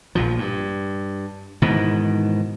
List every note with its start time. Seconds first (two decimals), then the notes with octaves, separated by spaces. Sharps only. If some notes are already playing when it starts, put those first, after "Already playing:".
0.15 A#1 A#2 F3
0.39 G2
1.62 G#2 B2 D#3 E3